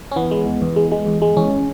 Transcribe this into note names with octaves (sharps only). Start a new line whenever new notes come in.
C#4
E3 B3
G#3
E2
E2
G#3
G#3
E2
G#3
E2 C#4